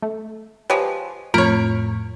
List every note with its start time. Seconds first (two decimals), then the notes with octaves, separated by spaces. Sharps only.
0.02 A3
0.70 F3 G#3 G4 B4 C#5
1.34 F2 A2 F4 A#4 C#5 B5 F6 D7